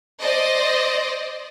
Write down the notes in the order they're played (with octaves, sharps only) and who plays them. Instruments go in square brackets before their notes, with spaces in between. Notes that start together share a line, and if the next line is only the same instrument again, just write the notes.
[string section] C5 D5 D#5